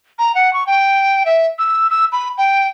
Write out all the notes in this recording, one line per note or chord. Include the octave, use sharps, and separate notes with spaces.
A#5
F#5
C#6
G5
E5
E6
E6
B5
G5